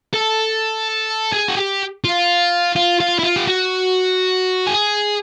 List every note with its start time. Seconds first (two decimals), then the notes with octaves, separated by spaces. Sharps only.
0.14 A4
1.32 G#4
1.48 F#4
1.57 G4
2.04 F4
2.76 F4
3.00 F4
3.19 E4
3.23 F4
3.36 G4
3.47 F#4
4.67 G#4